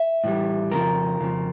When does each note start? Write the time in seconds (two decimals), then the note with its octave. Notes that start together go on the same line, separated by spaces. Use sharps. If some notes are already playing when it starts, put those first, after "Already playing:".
Already playing: E5
0.24 A2 E3 G3
0.71 F2 C#3 F3 A#4
1.20 F2 C#3 F3